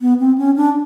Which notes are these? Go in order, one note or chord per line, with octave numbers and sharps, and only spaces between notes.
B3
C4
C#4
D4